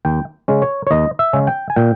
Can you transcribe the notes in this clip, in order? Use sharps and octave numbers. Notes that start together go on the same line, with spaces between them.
D#2 G5
C#3 G#3 C#4
C#5
C#5
D#2 D#5
E5
C#3 G#3 C#4
G5
G#5
A#2 G5